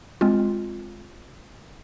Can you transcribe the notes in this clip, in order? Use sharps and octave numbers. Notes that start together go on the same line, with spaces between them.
G#3 C4 F4